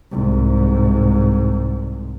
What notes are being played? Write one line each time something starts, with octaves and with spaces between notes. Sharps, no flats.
C2 G#2